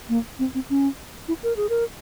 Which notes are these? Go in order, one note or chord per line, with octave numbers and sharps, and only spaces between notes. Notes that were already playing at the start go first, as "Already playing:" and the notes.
A#3
C4
C4
C#4
E4
A#4
G#4
A#4